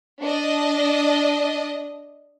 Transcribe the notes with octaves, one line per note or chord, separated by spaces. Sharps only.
D4 D#5